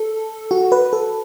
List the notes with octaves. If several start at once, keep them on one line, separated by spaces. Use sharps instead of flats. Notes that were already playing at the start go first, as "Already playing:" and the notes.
Already playing: A4
F#4
B4
A4